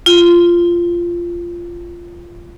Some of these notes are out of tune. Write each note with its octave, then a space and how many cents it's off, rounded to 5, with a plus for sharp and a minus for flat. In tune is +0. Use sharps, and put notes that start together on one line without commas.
F4 -15